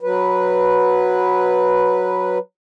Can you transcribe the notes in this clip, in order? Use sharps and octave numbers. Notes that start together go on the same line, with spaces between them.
F#3 B4